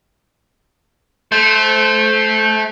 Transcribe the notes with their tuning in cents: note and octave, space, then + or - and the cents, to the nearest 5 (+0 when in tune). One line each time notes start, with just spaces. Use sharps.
A3 -20 C5 +0